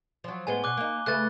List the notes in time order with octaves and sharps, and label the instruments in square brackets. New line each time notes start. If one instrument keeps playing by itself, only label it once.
[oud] F3 F#3
[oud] A2 G#3 B3 [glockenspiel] G#5 G7
[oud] B2 [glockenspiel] D6 F#6
[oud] A#3 D#4
[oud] C#3 A3 B4 [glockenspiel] F#6 A6